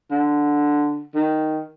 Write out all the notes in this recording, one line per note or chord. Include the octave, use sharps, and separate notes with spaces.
D3
D#3